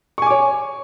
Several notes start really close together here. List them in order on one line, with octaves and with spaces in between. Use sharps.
C#6 G#5 D6 C#5